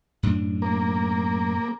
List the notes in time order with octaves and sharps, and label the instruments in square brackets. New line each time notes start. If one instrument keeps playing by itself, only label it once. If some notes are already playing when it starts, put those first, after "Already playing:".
[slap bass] F#2 A2 D4
[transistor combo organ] A#3